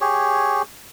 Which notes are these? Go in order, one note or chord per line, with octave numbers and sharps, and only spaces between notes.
G4 G#4 C#5